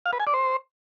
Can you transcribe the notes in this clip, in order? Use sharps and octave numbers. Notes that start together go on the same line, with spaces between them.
F5
B4
G#5
D5
C5